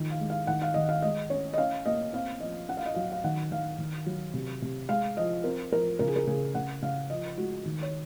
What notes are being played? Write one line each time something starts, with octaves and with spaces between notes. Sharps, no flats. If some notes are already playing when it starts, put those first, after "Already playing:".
Already playing: D#3 F3
F5
G#3
F5
D#3 F#5
F5
D#3 D#5
F5
G#3 D#5
C#4 C#5
D#5
C#4 F5
A#3 D#5
C4 F5
F3 D#5
C#4 F#5
F5
D#5
F#3 F5
F5
D#3 F#5
D#3 F5
D#3
F#3
C3
C3
G#3 F5
F3 D#5
C4 A#4
F3 A#4
C#3 A#4
G#4
A#4
C#3 G#4
C#3 F#5
C#3 F5
F3 D#5
G#3 F#4
D#3
C#5